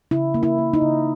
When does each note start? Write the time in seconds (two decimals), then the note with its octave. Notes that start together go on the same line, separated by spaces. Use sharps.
0.11 C#3 E4
0.34 A#3
0.43 E4
0.58 A#3
0.73 D#4
0.82 C#3